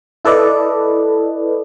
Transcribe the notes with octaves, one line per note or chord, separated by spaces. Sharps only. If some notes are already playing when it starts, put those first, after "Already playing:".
E4 A4 B4 D5 D#5